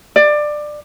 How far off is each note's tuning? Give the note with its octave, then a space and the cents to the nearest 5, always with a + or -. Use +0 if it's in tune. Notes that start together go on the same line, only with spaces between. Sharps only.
D5 +20